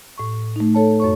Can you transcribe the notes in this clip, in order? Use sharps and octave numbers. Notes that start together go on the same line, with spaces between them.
A2 C#6
A3 D#4
A4 C#5 A5
F#2 C#5 C#6